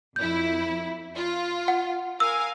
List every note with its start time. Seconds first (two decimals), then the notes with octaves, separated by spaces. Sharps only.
0.16 F2 E4 G6
1.16 F4
1.68 F#5
2.20 A#4 F5 G#5 E6